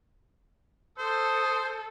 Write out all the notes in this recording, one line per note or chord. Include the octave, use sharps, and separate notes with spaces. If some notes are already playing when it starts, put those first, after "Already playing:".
A4 C5 D#6